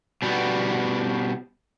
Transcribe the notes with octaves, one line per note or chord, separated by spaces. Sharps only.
B2 G3 B3